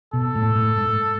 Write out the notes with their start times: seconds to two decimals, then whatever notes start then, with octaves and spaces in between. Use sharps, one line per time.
0.13 B2 A4
0.35 A2
0.55 A2
0.77 G#2